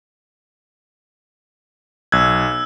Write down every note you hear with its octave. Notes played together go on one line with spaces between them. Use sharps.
B1 E6 F#6 G#6